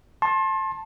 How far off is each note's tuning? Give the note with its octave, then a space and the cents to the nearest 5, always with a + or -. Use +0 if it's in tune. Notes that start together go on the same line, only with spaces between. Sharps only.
A5 +0 C6 +35